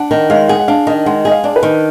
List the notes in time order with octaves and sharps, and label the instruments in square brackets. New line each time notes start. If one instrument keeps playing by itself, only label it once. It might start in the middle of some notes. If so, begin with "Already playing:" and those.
Already playing: [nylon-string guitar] D4 [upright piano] F#5
[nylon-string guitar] D#3
[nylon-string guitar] G#3 [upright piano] F5
[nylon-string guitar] G#4 [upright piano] F#5
[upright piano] F#5
[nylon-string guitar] D4 [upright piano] F5
[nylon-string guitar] D#3 [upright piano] D#5
[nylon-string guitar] G#3 [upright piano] F#5
[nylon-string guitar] G#4 [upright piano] D#5
[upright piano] F5
[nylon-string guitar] D4 [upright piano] D5
[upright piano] B4
[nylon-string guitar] D#3